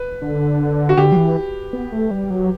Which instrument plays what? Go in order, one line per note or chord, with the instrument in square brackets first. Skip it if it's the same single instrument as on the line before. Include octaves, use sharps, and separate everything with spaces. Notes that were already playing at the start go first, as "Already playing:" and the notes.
Already playing: [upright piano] B4
[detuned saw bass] D3
[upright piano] F#4
[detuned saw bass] D3 [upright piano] G4
[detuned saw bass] F#3
E3
B3
A3
G3
F#3